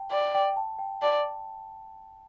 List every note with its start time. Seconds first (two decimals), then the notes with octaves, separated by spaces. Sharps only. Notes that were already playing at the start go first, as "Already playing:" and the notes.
Already playing: G5 A5
0.11 D5 G5
0.35 G5
0.56 A5
0.79 G5
1.02 D5 A5